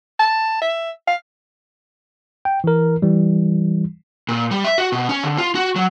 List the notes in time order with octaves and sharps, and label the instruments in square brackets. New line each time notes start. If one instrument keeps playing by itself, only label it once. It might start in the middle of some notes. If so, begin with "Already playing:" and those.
[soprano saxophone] A5
E5
F5
[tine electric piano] G5
E3 A#4
E3 G3
[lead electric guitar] A#2
G3
E5
F#4
B2
C#4
D3
F4
F#4
F#3